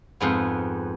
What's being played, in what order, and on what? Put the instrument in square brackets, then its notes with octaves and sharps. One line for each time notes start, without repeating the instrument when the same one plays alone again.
[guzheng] F2 G#2 B3